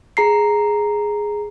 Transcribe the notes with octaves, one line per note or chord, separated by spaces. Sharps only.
G#4 A#5 C7